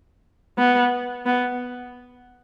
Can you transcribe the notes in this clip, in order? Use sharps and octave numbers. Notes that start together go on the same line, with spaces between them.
B3
B3